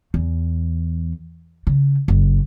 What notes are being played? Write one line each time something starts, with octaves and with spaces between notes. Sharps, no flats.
E2
C#3
F#1